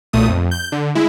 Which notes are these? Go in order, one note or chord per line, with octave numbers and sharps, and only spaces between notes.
B1 A#2 A3 D#6
F2
G6
D3
G#3 E4